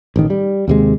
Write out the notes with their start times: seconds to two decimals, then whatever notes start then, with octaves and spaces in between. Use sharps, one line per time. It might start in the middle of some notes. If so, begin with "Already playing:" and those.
0.16 A1 D#3
0.30 G3
0.68 D#2 C3 G#3